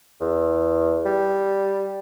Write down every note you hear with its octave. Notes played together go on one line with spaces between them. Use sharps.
E2
G3